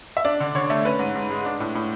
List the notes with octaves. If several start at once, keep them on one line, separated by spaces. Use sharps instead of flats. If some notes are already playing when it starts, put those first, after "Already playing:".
E5
D4 D5
D3
D3 C#5
A3
C#4 B4
G#2
G#2
G#3
D4
A2
A2